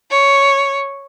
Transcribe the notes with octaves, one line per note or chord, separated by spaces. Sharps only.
C#5